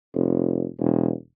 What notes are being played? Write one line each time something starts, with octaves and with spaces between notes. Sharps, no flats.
F1
E1